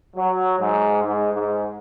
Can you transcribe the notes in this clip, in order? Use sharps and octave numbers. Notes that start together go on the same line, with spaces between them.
F#3
G#2
G#2
G#2